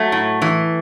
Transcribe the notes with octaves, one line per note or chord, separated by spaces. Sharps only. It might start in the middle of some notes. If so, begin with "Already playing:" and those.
Already playing: F#3 A3
A2
E3